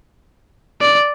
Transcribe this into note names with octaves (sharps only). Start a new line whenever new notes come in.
D5